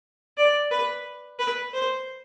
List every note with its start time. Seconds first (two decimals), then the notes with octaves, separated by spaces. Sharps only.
0.37 D5
0.71 B4
1.39 B4
1.74 C5